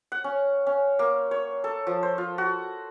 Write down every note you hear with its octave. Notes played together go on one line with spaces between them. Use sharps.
F#5
C#4
C#4
A#3
C#5
A4
F3
C5
F4
F#4